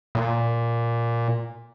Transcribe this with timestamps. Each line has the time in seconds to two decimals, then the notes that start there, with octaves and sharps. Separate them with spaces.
0.15 A#2